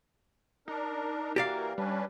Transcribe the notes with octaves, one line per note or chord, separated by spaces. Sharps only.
D4 D#4 A#4
E3 A#3 F#4 G4 A#4 D5 F5
G3 C#4 D4 B4